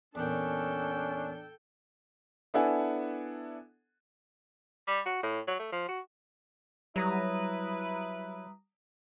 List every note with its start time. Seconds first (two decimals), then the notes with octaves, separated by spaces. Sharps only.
0.15 E2 A#2 C#4 D4 A4 G5
2.54 B3 D4 E4 A4 F#5 G#5
4.87 G3
5.06 F#4
5.23 A2
5.47 F#3
5.59 A3
5.72 F3
5.89 F#4
6.96 F#3 G3 E4 B4 A#5 D#6